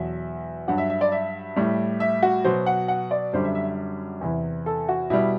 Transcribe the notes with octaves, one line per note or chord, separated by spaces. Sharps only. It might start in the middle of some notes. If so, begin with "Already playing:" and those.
Already playing: E2 B2 F#3 E5
G2 F#3 F#5
E5
E5
D5
E5
A2 G3
E5
F#4
B2 F#3 C5
F#5
F#5
D5
F#2 D3 G3 C5
E5
E5
E2 C3 E3
A4
F#4
B2 G3 E4